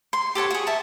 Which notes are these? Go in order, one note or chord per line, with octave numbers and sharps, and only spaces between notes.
C6
G4 A4 C#5 F#5
F#4 G#4
E5 A5